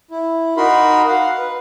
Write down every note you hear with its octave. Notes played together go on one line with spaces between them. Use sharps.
E4
D#4 F#4 A#4 B5 C6
F5 F#5
B4